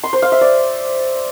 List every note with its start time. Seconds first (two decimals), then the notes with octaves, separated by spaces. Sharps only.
0.03 C6
0.13 C5
0.22 F5
0.32 E5
0.41 D5